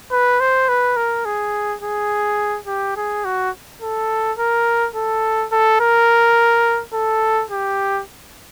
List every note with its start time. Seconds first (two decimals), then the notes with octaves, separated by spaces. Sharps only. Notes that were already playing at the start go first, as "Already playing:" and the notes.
0.12 B4
0.40 C5
0.68 B4
0.96 A#4
1.25 G#4
1.82 G#4
2.67 G4
2.96 G#4
3.25 F#4
3.81 A4
4.38 A#4
4.95 A4
5.52 A4
5.80 A#4
6.93 A4
7.50 G4